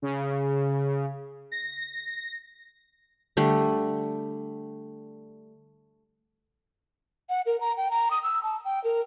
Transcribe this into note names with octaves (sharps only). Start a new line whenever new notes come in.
C#3
A#6
D3 G3 A3
F#5
A#4
A#5
G5
A#5
D#6
E6
A5
G5
A#4